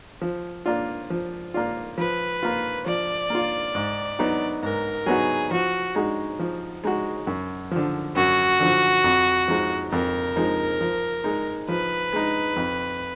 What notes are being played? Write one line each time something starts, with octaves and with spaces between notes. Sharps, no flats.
F3
A#3 D4 F4
F3
A#3 D4 F4
F3 B4
A#3 F4
F3 D5
A#3 F4
G#2
F#3 B3 D#4 F#4
G#2 A#4
F#3 B3 D#4 F#4 G#4
F3 F#4
G#3 D#4 F#4
F3
G#3 D#4 F#4
F#2
D3 F3
F#2 F#4
D3 F3
F2
F3 G#3 D#4
F2 A#4
F3 G#3 D#4
F3
G#3 D#4
F3 B4
G#3 D#4
F2